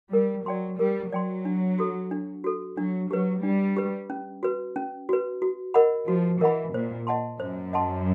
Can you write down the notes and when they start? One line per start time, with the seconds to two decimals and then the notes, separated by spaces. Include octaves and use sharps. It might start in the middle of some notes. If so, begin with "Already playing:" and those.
0.12 G3 A#4
0.46 F#3 D5 G5 C6
0.79 G3 A#4
1.12 F#3 D5 G5 C6
1.45 D4
1.79 F#4 A4
2.11 D4
2.44 F#4 A4
2.78 F#3 D4
3.11 F#3 G4 B4
3.43 G3 D4
3.77 G4 B4
4.10 C#4
4.43 F#4 B4
4.76 C#4
5.09 F#4 B4
5.42 F#4
5.74 A#4 D#5 F#5 B5
6.08 F3 F#4
6.41 E3 A#4 D#5 F#5 B5
6.74 A#2 C5
7.07 D#5 F#5 A5 C6
7.40 F#2 C5
7.73 D#5 F#5 A5 C6